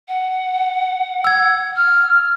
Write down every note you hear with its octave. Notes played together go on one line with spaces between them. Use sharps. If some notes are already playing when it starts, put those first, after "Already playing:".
F#5
E6 G#6
F6